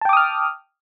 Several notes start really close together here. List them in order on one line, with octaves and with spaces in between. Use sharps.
A5 G5 D6 D#6 F6